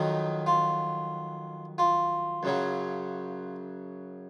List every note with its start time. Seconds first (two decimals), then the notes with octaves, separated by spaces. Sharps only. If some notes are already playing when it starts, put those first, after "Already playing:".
Already playing: F2 D#3 F#3 D#4
0.47 F4
1.78 F4
2.43 F#2 C#3 F#3